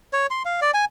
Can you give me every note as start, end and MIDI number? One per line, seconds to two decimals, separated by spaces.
0.13 0.27 73
0.31 0.43 84
0.45 0.60 77
0.62 0.71 74
0.74 0.85 80